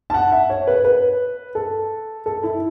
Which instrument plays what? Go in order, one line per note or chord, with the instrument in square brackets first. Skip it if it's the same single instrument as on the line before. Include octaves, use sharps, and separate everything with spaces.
[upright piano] A5
F#5
E5
C#5
B4
B4
A4
A4
E4